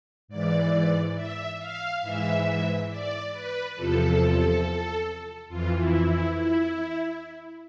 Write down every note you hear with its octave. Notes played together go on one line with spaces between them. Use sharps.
G#2 E3 D5
E5
F5
G#2 E3 E5
D5
B4
E2 C3 F3 A4
F2 E3 F4
E4
E4
E4